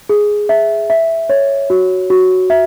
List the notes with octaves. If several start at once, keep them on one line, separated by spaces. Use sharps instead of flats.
G#4
E5
E5
C#5
F#4
F#4
E5